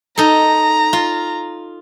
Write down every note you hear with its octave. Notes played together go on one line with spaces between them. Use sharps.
D#4 A4 A#5
F4